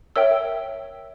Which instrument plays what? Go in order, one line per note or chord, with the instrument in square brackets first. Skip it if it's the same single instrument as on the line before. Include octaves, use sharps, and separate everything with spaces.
[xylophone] A#4 C#5 E5 G5 E6